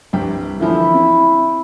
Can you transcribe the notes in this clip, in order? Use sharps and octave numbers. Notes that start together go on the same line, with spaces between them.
C2 G2 G5
D3 E3 F3 E4
C4